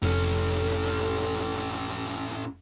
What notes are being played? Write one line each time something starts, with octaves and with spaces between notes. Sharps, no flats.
F1 A2 C#4 A4